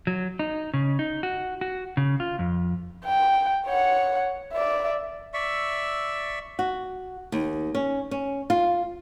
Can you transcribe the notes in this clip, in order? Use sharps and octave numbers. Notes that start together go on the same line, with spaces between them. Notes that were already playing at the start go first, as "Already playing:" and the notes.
F#3
D#4
C#3
D#4
F#4
F#4
C#3
F4
F2
G5
C#5 F#5
D5 E5
D5 E5 C#6 E6
F#4
D#2
C#4
C#4
F4